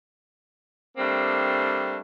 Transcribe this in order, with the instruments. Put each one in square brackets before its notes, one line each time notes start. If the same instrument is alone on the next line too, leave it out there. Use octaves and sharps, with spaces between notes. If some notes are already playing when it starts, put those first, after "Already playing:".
[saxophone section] G3 A3 A#3 C4 D4